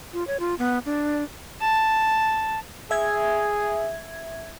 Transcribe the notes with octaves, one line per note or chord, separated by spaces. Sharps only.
F4
C#5
F4
B3
D4
A5
G#4 E5 G#6